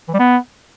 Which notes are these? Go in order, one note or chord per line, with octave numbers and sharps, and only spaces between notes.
E3
G3
B3